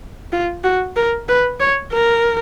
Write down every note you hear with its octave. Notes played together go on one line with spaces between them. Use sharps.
F4
F#4
A#4
B4
C#5
A#4